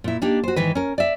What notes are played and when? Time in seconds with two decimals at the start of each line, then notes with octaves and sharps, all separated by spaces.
0.04 A#2 E4
0.22 A#3 D4 D#4 G4
0.44 F#4 C5
0.56 G#2 D#3 E3 B4
0.75 C#4 A#4
0.98 D5 E5